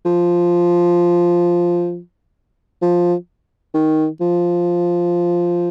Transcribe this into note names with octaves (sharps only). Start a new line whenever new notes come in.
F3
F3
D#3
F3